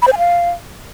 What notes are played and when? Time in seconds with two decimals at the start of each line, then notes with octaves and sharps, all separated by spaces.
0.02 B5
0.07 C5
0.13 G#5
0.18 F5